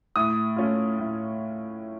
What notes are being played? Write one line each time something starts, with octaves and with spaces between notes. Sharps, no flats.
A2 D#6
A3 C#4 F4
A2